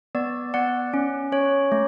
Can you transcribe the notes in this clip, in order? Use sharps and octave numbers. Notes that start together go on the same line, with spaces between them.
B3 D5
B3 D5 F#5
C#4
C#4 C#5
A3